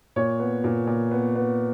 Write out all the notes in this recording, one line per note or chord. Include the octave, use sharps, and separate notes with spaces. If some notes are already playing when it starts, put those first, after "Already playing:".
A#2 C#5
B3
A#2
A#2
B3
B3